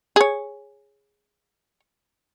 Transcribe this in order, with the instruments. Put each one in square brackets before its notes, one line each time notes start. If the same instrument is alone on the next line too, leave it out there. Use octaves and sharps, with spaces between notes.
[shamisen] G#4 C#5